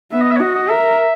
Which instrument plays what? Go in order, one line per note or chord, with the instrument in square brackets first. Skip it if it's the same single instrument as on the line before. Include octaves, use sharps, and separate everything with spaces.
[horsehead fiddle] B3 [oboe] E5
[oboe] D#5
E5
C#5
[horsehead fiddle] F#4 [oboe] D#5
[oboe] D#5
[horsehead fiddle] A#4 [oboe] E5